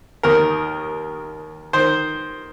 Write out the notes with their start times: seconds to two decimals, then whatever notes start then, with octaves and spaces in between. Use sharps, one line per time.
0.23 D#2 D#3 A#4
1.73 D#3 C5